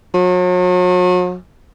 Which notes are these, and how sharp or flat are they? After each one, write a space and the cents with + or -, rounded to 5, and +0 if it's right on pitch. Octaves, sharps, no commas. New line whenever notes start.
F#3 -40